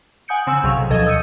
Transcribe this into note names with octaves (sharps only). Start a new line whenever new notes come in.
F#5 G#5 D#6 G6 C#7 D7
C#3 C4 F#5 G#5 E6
B1 C3 F#3 G#4 F5 C#6
A2
D2 B2 F3 A4 D#5 G#6
D#6 E6 G6 G#6 C#7 D#7